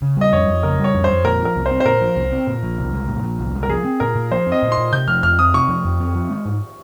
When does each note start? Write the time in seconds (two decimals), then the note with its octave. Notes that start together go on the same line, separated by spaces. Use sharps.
0.02 C#3
0.17 G3 D#5
0.32 F2 C#5
0.47 F2
0.63 C#3 A#4
0.79 G3
0.84 C#5
0.94 F2
1.04 C5
1.09 F2
1.24 A#2 A#4
1.40 F3
1.45 A#4
1.56 C2
1.66 C5
1.71 C4
1.80 C5
1.85 A#2 A#4
2.01 F3
2.16 C2
2.32 C4
2.47 A#2
2.63 F3
2.78 C2
2.93 G#3
3.09 A#2
3.23 F3
3.39 C2
3.55 G#3
3.63 A#4
3.69 F3 G#4
3.85 C4
4.00 A#2 A#4
4.16 A#2
4.32 F3 C5
4.47 C4
4.52 D#5
4.62 A#2
4.72 C6
4.78 A#2
4.93 C3 G6
5.08 F3 F6
5.23 F2 F6
5.39 C4 D#6
5.54 C3 C#6
5.69 F3
5.85 F2
6.00 C4
6.15 F3
6.30 G#3
6.45 G#2